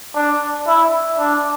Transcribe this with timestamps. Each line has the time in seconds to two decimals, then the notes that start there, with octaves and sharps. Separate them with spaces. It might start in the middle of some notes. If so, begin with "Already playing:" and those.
0.15 D4
0.67 E4
1.19 D4